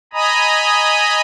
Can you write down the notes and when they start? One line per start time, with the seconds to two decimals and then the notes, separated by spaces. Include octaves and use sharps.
0.13 D#5 G#5 A#5 B5 D#6